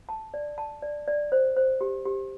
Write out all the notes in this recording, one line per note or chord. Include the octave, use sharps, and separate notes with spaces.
A5
D5
A5
D5
D5
C5
C5
G4
G4